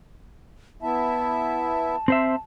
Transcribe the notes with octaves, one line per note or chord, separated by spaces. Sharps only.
B3 E4 E5 A5
C4 C5 E5